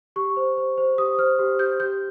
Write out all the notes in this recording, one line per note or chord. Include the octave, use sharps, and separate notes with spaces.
G4 C#6
C5
C5
C5
G4 D#6
C5 F6
G4
G4 G6
G4 G6